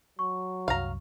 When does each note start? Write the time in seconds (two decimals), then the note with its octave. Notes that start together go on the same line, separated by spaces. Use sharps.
0.19 F#3 C#6
0.68 C2 F#2 F5 A#5